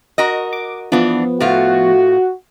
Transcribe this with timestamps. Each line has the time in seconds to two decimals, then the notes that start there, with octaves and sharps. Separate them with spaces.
0.18 F#4 A#4 D#5
0.53 D6
0.92 E3 F3 B3 D4
1.40 A2 A3 F4 F#4